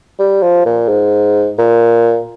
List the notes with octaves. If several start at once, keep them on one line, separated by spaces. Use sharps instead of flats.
G3
F3
A#2
G#2
A#2